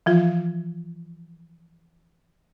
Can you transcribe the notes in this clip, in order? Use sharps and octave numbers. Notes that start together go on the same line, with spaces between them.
E3 F3 F4